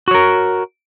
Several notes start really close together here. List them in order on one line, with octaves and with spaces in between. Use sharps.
F#4 C#5 A#4